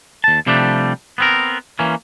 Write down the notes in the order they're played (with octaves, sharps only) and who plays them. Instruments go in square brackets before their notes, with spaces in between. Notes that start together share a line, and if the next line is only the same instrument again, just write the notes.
[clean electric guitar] D#2 A5
C3 F3 G3 A3 D4
B3 C4 A#4
E3 A#3 C#4